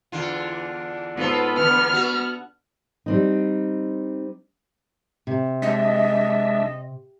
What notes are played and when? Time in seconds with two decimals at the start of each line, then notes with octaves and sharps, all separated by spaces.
0.12 E2 D3 F4
1.17 G#2 B3 F4 A4
1.57 E2 D3 F6
1.93 F#4
3.06 G3 C4 D#4
5.27 C3
5.62 G#3 D4 D#5 E5